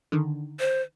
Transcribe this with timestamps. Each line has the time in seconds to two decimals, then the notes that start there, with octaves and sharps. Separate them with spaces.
0.12 D3 D#3
0.59 C5